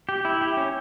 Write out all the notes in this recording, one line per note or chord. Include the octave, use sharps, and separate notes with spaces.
G4
E4
G4
C#4